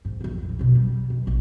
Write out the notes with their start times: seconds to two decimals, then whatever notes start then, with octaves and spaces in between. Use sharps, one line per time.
0.05 G#2
0.21 A#1 F2
0.59 B2 D3
0.75 G3
1.10 B1
1.27 A#1